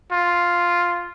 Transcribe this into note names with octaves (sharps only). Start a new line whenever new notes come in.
F4